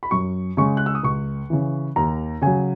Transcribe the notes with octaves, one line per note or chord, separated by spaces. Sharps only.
B5
F#2 C#6
C#3 G#3 C#6
F#6
E6
D#6
C#2 C#6
C#3 E3
D#2 A#5
C#3 F#3 G#5